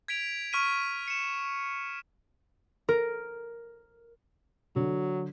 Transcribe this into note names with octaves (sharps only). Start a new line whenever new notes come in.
G#6 B6 D7 F7
C#6 F6 B6 D#7
C#7 E7
A#4
D3 F#3